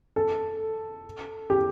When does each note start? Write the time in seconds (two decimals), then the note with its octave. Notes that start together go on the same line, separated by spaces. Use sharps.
0.16 A4
1.50 G4